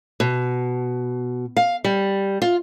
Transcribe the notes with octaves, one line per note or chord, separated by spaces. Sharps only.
B2
F5
G3
F4